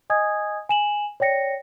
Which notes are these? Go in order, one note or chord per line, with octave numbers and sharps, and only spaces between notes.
D#5 G#5 D#6 G#6
G#5 E7 F#7
C#5 D5 G5 A#6 C#7